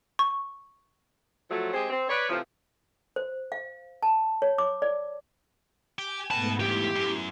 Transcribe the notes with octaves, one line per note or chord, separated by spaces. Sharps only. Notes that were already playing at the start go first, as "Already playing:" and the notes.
C#6
F3 F#3 A3
G#3 C4 G4 G#4 C5 D#5
C4
B4 C#5 D5
A2 C3 E3 F3
C5
F5
A5
C#5
D6
D5
G4 G5 G#5 G#6
G#2 A3 B3 F#4 B4 A5
E2 G2 E4 G4 C6
F#2